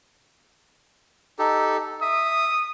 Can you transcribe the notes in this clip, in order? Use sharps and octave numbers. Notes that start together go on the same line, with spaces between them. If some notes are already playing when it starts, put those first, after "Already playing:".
D#4 G4 A4
E5 D#6